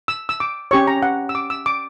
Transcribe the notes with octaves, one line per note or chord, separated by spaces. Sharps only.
E6
E6
D6
C#4 G4 C#5 C#6
A#5
F#5
E6
D6
E6
D6